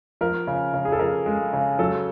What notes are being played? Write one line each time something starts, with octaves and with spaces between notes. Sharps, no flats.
F3 A#4
C#3
C#3
G#4
A4
F3 A#4
G#3
C#3
F#3 A4